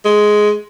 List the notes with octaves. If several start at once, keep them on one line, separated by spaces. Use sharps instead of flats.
G#3